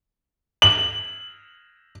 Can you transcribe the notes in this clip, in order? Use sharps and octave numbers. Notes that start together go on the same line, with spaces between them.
F#7